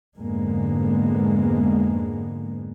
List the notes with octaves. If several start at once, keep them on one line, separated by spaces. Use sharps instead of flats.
F2 G#2 D3 G#3 A#3 B3